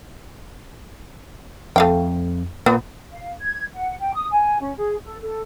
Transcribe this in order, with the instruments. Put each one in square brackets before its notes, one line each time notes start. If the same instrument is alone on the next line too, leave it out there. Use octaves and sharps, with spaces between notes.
[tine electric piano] F2 [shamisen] A3 F5 G5
[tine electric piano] A#2 A#3 [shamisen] B3
[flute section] F5
G#6
F#5
G5
D#6
G#5
C#4
G#4
A4
A4